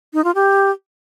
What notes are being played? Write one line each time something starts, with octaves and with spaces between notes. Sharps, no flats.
D#4
F4
G4